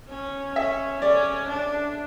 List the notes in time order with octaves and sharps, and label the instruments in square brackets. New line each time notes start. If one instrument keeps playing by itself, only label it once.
[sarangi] C#4
[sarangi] C#4 [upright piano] E5
[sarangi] C#4 [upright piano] D5
[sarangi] D4